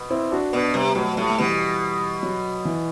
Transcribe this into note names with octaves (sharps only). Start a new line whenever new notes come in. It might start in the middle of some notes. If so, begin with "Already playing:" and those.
Already playing: B2
C4 E4
D4 F#4
B2 B3 D4
C3 G3 B3
B2 F#3 A3
A2 G3
A3
B2 E3 G3
F#3
E3